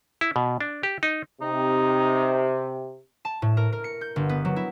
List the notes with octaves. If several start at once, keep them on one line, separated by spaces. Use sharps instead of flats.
E4
B2
D4
G4
D#4
C3 D#4
A5
A2
A#4
A#4
C#7
G6
G1
B3
F#3
E4